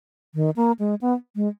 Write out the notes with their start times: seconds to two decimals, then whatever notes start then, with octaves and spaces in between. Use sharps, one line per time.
0.35 D#3
0.56 A#3
0.79 G#3
1.01 B3
1.36 G#3